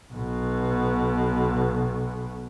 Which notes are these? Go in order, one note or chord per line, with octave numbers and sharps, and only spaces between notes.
B1 B2